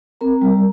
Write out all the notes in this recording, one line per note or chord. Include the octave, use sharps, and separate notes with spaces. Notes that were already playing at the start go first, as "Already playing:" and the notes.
C4 A#4 A#5
G3